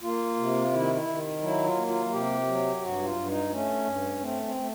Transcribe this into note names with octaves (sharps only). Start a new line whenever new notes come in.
A#3 F4
C3
D#3 E4
E4
D#3
F#3 E4
F4
A#3
F4
C3 G4
F#3
G2 F#4
F4
G2
D#4
A3 C#4
G2
A3 C4
C4
A3